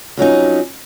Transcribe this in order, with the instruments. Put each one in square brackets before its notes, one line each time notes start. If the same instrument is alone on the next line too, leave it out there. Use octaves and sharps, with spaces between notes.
[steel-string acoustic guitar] F2 F#3 C#4 D#4